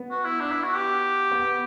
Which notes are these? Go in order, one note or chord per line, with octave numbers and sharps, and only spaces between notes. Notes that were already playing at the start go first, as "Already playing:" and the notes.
Already playing: B3
F#4
E4
D4
E4
F#4
G4
B3